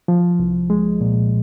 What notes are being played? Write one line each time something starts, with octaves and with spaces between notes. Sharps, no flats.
F3
C2
G#3
A#2